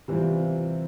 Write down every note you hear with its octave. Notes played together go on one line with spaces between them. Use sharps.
C3 E3 G3 C4 F4